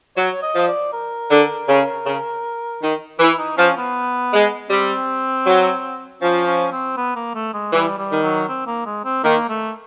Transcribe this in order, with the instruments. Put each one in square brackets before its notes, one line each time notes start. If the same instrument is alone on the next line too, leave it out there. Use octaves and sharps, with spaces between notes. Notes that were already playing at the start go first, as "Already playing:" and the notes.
[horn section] F#3 [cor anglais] C#5
[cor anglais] D#5
[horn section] F3
[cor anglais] D5
A#4
[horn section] D3
C#3
C#3
D#3
[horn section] E3 [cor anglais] E4
[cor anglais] D#4
[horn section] F3 [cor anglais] C#4
[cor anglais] B3
[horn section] G#3
[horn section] G3 [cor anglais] C4
[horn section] F#3
[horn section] F3 [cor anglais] C#4
[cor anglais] C#4
C4
B3
A#3
A3
G#3
[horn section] E3 [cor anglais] G3
[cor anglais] G3
[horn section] D#3
[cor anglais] F#3
C4
A#3
G#3
C4
[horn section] D#3 [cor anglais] A#3
[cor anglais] A3